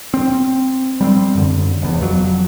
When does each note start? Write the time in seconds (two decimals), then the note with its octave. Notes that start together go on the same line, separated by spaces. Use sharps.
0.14 C4
1.01 G3 A#3 C4
1.35 F#2 D3
1.82 F1 E2
2.01 F2 F#3